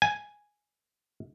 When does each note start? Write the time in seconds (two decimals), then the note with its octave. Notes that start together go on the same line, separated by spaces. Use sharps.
0.02 G#5